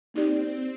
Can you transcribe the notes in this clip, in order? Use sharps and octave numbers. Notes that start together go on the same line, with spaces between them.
A#3 C4 D#4 G4 D5